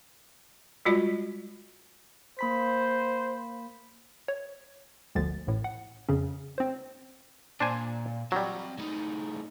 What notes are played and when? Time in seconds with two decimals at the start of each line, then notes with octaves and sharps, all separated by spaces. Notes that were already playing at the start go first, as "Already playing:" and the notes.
0.85 G3 G#3 F4 F#4 D5
2.39 A#3 C5 B5 B6
4.28 C#5
5.15 G1 D2 D3 F3 A6
5.47 A1 A2
5.64 F#5
6.09 F2 C#3 C#4
6.58 C4 C5
7.60 A#2 D4 C5 G#5
8.32 F#3 G3 C4 A5
8.79 A2 D#4